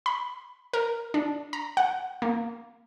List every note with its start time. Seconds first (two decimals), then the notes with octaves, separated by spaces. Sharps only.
0.06 B5
0.73 A#4
1.14 D4
1.53 A#5
1.77 F#5
2.22 A#3